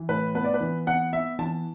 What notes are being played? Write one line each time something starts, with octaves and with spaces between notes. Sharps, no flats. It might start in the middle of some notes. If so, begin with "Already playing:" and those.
Already playing: E3
A2 B4
B3 B4
D5
B4
E3
B3 F#5
B3 E5
E3 A5